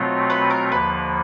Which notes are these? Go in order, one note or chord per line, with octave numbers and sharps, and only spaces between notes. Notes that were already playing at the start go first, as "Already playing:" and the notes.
Already playing: B2 F#3 A3 C4 F4
B4
A#4
D#2 D3 F3 A#3 B4